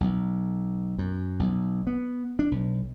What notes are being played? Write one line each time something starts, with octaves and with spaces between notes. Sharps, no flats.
B1
F#2
B1
B3
D4
B1